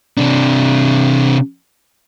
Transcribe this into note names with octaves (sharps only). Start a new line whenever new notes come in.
C3 D4